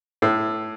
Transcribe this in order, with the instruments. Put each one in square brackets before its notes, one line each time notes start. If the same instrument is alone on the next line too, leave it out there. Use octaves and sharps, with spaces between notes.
[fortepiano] A2